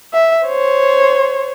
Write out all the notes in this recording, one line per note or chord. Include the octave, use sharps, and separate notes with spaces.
E5
C5 C#5